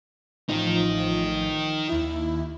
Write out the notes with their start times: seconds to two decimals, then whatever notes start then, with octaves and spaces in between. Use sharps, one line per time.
0.49 A1 D#3 F3 D#4
1.89 D#2 E4